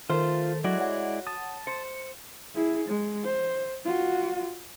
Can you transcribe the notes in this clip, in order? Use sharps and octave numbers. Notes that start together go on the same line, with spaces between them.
D#3 A3 F4 A#4 C5
F#3 G#3 E4 F#4 D5
C#5 F#5
A5 D#6
C5 C#7
E4 G#4
G#3
C5
F4 F#4